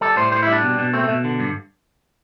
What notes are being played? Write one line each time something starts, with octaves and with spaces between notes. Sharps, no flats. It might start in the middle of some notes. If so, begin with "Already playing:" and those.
G3 A4
A2 C5
A2 C5
E4
G3
D4
B2
B2
A3 C4
A3
B2
D3
G2